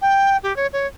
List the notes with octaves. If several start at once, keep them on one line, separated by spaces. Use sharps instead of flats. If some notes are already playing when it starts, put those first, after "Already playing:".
G5
G4
C#5
C#5